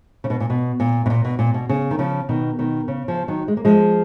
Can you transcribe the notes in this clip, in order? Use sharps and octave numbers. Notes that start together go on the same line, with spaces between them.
C#3
B2
A#2
B2
A#2
B2
A#2
B2
A#2
B2
C#3
D#3
C#3 F3
B2 D#3
B2 D#3
C#3
C#3 F3
D#3 F#3
G#3
A#3
F3 G#3